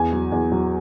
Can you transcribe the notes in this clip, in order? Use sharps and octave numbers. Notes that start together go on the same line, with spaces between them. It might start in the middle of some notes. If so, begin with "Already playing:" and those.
Already playing: E2 G#5
F#3
E2
F#3